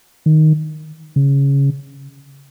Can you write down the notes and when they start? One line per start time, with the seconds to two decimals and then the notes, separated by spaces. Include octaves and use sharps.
0.26 D#3
1.16 C#3